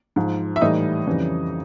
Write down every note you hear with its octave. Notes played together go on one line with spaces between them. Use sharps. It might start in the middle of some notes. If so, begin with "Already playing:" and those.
G#2 F3
E5
A2 E3 G3 D#4 D#5
F2 C#3 E3 G3